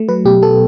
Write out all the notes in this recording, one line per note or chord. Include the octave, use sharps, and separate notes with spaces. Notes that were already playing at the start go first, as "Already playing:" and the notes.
Already playing: A3
F#3 B4
B2 G4
B3 A4